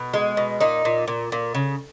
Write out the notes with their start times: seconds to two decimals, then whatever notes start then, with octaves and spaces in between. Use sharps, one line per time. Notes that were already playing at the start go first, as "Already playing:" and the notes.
Already playing: B2
0.14 G#3
0.37 B2
0.60 A#2 D#4
0.85 A#2
1.08 A#2
1.32 A#2
1.55 C#3